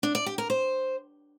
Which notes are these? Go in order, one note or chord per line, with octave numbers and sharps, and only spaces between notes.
D4
D5
G4
A#4
C5